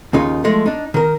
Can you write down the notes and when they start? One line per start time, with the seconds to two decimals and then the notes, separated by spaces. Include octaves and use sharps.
0.13 D#2 C#3 D#4 F4
0.44 F3 G#3 A3
0.66 D4 D#4
0.94 D#3 A#4